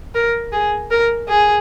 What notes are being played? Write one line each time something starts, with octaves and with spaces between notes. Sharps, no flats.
A#4
G#4
A#4
G#4